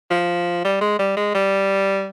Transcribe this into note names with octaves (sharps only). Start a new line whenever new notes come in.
F3
G3
G#3
G3
G#3
G3